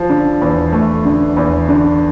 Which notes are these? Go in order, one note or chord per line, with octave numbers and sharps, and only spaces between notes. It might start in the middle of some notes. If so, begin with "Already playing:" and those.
Already playing: F3
D3
E2
A3
D3
E2
D3